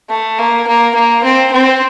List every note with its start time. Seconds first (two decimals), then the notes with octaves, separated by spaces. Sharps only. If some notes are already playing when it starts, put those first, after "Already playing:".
0.10 A3
0.39 A#3
0.67 A#3
0.95 A#3
1.23 C4
1.52 C4